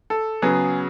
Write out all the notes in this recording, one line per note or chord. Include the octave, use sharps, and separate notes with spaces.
A4
C#3 F#3 B3 G#4